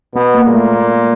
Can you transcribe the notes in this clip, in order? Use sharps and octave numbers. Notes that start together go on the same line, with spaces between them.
B2 B3
A#3
A#2 G#3
A3